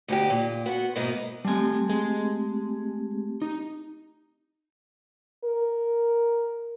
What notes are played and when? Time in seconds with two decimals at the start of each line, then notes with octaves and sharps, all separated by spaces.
0.08 D2 B2 D#4 F4 G4
0.30 A#2
0.66 B3 F#4
0.95 G#2 B2 A#3 B3 D#4 E4
1.45 G3 A3 C4 G4 G#5
1.89 G#3 G#4
3.42 D#4
5.44 A#4